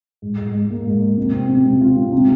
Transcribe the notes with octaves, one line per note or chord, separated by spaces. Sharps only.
G#2
G#2
G#2
A#3
G#2
G#2
C3
C4
C3
C3
F4
C3
C3